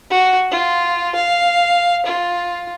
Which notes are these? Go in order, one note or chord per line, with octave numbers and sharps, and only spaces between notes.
F#4
F4
F5
F4